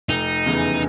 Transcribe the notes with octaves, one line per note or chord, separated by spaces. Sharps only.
F1 D#4
E2 C#3 E3